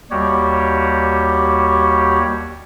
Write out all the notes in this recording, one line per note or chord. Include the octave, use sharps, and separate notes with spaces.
D#2 G3 F#4 G4 C#5